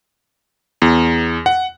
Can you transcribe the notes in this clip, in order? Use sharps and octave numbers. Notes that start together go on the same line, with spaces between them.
E2
F#5